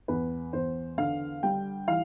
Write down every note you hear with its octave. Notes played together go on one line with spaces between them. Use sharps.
E2 B4
E2 C5
D3 F5
G3 G5
E3 F5